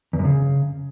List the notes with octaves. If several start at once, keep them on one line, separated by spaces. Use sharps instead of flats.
E2
F#2
C#3